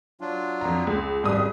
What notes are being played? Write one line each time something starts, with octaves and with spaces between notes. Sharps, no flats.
F#3 D4 F4
F2 A#5
C#2
G#1 F2 C#3 G3 D#6